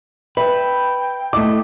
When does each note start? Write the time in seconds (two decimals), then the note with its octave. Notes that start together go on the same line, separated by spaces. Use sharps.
0.37 B4 E5 G5
1.33 A3 E4 D#5 D6